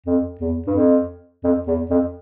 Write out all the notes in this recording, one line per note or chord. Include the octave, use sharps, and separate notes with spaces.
F2
E2
G2
F2
F2
E2
F2